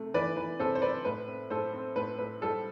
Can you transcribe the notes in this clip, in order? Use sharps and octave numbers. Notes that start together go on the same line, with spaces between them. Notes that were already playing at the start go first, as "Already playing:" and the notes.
Already playing: C3 A3
E3 B4 D5
E3 B4
C3 A4 C5
C5
C4 B4 D5
A2 B4
C4
A2 A4 C5
C4
A2 B4
A2 B4
G3 A4